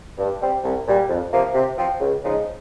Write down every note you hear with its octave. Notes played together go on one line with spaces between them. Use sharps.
G2
G3 C4
C2
A#2 G3
F2
C3 F3 A#3
C3
F3 C4
C#2
C#3 F3 G#3 D#4